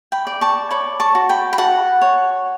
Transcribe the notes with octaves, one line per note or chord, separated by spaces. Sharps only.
G5 B5
D5
A5 C#6
C#5 B5 D6
A5 C#6
F#4
G5 B5
B5
F#4 F#5 A5
C#5